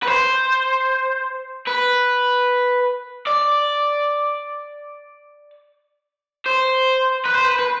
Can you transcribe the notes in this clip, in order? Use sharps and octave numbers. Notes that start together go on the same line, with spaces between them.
B4
C5
B4
D5
C5
B4
C5
B4
B4